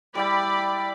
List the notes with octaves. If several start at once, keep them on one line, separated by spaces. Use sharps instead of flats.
G3 E4 D5 G5 B5